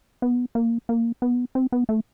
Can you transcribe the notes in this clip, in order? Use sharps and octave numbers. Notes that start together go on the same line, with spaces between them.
B3
A#3
A#3
B3
C4
B3
A3